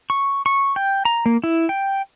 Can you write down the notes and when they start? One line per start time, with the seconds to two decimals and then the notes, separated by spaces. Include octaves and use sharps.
0.10 C#6
0.46 C#6
0.76 G5
1.05 A#5
1.26 A#3
1.44 E4
1.69 G5